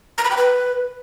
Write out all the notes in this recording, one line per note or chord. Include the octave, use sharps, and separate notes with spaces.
A#5
B5
G5
B4